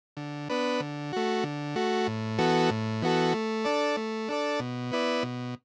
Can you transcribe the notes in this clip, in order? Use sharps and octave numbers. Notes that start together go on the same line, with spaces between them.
D3
B3 D4 B4
D3
A3 F#4
D3
A3 F#4
A2
E3 B3 F#4 A4
A2
E3 B3 F#4 A4
A3
D4 A4 D5
A3
D4 A4 D5
B2
B3 E4 B4 D5
B2